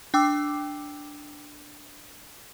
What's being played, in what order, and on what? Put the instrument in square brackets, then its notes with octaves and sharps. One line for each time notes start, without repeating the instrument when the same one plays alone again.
[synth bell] D4 G5 D6 E6